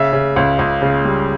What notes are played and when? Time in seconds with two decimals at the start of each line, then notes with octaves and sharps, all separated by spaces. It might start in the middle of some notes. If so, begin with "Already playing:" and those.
Already playing: C#3 E5
0.13 C#3
0.36 C#2
0.59 C#2
0.82 C#3
1.05 G3